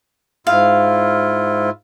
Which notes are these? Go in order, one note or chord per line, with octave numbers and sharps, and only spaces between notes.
G#2 E4 F4 F5